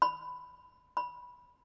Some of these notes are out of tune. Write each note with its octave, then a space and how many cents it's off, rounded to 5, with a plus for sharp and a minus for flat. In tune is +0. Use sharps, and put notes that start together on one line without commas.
B5 +10
B5 -10